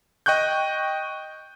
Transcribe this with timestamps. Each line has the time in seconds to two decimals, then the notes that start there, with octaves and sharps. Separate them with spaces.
0.26 D#5 G5 C#6 F#6 G6